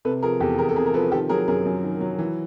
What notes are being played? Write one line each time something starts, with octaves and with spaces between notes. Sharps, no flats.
C3 A4 B4
F3 G#4 A#4
E2 G4 A4
E2 G#4 A#4
A4
C3 G#4 A#4
A#4
F3 A4 B4
D#3 G4 A4
F#3 G#4 A#4
F#2 G#4 A#4
F#2
D#3
F#3
E3